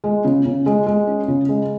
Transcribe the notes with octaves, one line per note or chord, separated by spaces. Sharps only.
G#3
C#3
C#3
G#3
G#3
C#4
C#3
G#3